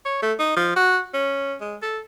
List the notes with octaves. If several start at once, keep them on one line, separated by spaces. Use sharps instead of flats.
C#5
A3
D#4
F3
F#4
C#4
G#3
A4